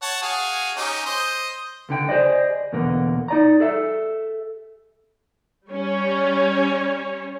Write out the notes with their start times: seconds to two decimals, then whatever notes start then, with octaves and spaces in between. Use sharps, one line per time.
0.02 C#5 F#5 A5
0.22 F#4 G#4 F5
0.77 C#4 D#4 G4
1.06 C5 D#5
1.89 C#2 D3 G5
2.09 G#4 C5 D5 D#5
2.72 E2 B2 D3 A#3
3.28 D#4 D5 A#5
3.60 G#4 A4 E5
5.70 G3 C#4 C#5